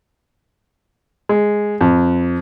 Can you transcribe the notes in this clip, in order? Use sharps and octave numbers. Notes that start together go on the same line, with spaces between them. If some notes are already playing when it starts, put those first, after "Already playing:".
G#3
F2